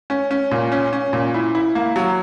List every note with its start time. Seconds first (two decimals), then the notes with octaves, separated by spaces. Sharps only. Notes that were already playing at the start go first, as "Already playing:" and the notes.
0.10 C#4
0.31 C#4
0.51 A#2
0.72 C#4
0.93 C#4
1.13 A#2
1.34 E4
1.55 E4
1.75 A#3
1.96 F#3